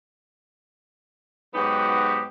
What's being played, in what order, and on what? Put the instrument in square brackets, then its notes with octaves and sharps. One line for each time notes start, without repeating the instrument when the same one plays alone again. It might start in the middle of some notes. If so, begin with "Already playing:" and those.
[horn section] G#2 F#3 B3 D#4 F#4 G4